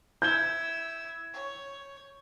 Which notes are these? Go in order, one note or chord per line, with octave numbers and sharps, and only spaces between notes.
E4 E6 G6 G#6 G7
C#5